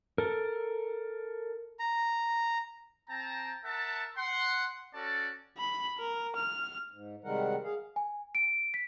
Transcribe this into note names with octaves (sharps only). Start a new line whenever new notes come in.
A4 A#4
A#5
C4 G5 A5 A#5
A#4 E5 F#5 A5
F#5 C6
C#4 F#4 A4 D5 A5
B5
A#4
F6
G#2
C3 D#3 G3 G#3 A#4 F#5
G#4 F5
G#5
D7
B6